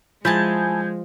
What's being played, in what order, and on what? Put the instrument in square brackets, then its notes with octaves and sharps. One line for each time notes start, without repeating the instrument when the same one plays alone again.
[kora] F3 [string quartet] G#3 [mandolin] E4 G#4 A5 [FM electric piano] G6 G#6